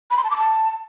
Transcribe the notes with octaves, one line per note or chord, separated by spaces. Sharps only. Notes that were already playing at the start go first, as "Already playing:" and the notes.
B5
C6
A5
D6
A5